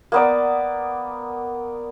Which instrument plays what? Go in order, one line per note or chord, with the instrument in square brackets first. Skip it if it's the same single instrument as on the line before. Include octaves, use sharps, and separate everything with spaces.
[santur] A#3 B3 D5